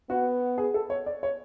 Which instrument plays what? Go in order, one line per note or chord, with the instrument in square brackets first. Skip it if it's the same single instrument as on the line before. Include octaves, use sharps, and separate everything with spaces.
[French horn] B3 [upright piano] F#4
[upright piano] G#4
A4
C#5
D5
C#5